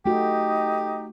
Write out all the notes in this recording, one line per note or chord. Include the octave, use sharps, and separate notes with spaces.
A3 D#4 F#4 G4